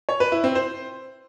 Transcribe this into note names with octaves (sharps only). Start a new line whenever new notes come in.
C#5
B4
E4
C4
C5